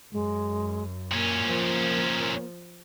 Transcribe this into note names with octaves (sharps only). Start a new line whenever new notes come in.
F#2 G#3
A#2 A#3 C#4
F3